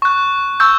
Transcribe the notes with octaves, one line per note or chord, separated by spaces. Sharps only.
C#6 F#6
C#6 E6 G6